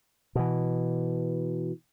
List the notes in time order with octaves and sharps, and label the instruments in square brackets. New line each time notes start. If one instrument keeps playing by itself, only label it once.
[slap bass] B2 E3